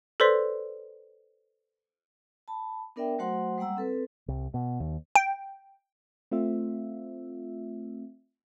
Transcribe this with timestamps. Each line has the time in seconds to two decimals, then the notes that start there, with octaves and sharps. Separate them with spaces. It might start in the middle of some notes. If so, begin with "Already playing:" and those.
0.20 A4 B4 C5 D5 C6 B6
2.48 A5 B5
2.96 B3 D4 A#4 D5 E5 G5
3.19 F#3 A3 F#4 C5 F#5 C6
3.58 G3 G#3 A#3 F#5 A#5 E6
3.77 C4 A4 B4
4.28 C2
4.54 B2
4.80 D#2
5.16 G5
6.32 A3 C4 F4 E5